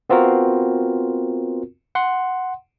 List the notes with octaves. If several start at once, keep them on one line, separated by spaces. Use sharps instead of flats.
B3 C4 F4 F#4 A#4
F#5 C6